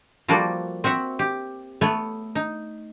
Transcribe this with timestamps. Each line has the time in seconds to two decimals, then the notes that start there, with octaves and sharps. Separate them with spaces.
0.28 F3 G3 A#3 F#4 A4 D5
0.84 C4 F#4 E5 F#5
1.19 G4
1.81 A3 B3 C#5
2.35 D#4